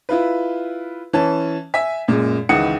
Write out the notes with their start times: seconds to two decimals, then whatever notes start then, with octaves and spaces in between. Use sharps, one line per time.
0.09 E4 F4 B4
1.13 E3 C#4 A5
1.74 E5 G#5 B6
2.08 F#2 A#2 G#3
2.49 C#2 D#3 E3 F#5 D#6 C#7